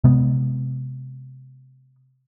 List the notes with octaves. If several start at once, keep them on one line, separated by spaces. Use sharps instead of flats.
C3 G#3 B3